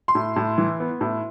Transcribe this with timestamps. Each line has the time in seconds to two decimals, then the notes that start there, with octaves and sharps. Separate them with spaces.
0.08 C6
0.15 A2
0.36 A2
0.58 E3
0.80 B3
1.01 A2